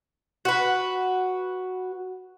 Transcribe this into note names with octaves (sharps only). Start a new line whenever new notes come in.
F#4 B4